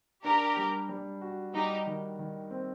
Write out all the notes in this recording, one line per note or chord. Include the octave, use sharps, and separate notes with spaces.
D4 G4 A#4
G3
G3
F#4
G3 D#4 G4
D#3
D#3
C4